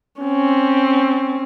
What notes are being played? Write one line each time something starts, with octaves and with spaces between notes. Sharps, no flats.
C4 C#4